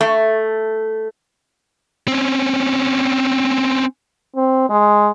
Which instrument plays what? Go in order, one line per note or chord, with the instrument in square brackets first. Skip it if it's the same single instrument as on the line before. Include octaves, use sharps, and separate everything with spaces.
[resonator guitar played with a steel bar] A3
[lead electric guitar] C4 C#4
[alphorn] C4
G#3